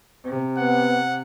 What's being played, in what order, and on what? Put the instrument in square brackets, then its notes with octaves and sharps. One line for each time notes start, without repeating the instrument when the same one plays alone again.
[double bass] C3
[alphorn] B3 [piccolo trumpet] F#5